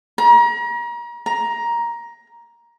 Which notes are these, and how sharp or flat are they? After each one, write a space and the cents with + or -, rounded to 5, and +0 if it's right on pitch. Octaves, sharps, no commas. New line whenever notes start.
A#5 +35
A#5 +15